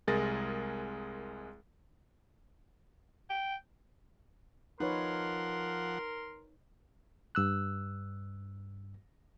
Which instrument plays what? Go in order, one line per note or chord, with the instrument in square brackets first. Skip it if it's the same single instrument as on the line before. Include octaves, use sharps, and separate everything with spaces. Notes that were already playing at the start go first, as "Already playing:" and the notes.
[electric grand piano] C2 G#3 G#4 A#4 A6 A#6
[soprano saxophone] G5
[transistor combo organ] F3 F#5 [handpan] D#4 B4 C#5 [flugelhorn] A#4 [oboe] C6
[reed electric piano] G2 E6 F#6